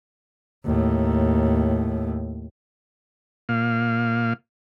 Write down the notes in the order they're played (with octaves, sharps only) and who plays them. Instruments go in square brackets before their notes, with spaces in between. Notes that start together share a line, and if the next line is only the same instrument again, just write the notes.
[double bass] D#2 A2
[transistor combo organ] A#2 F5